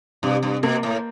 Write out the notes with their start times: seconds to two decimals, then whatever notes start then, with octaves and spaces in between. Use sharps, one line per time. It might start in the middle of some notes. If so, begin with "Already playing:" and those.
0.23 G2 C3
0.43 G2
0.63 B2 A#3
0.83 A2